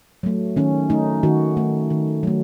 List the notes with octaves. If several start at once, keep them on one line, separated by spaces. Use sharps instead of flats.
F#3 A3
D#3 C#4
A3 D#4
D#3 F#4
A3
D#3
F#3 A3